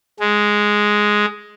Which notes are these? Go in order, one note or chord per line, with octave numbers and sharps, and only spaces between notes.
G#3